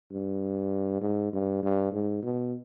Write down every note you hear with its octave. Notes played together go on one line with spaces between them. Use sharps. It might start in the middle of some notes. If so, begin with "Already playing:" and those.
G2
G#2
G2
G2
G#2
B2